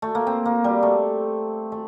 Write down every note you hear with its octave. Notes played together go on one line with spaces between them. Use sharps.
A3
A#3
C4
A#3
G3
A3
A3